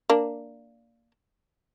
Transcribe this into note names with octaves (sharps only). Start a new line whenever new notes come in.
A#3 D4